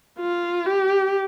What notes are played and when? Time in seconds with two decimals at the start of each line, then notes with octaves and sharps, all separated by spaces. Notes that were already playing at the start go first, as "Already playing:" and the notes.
0.19 F4
0.66 G4